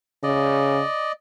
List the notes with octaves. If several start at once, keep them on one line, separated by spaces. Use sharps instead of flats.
C#3 D5 D#5